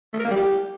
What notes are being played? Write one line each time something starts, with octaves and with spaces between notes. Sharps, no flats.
A3
A#4
A#3
G3
G4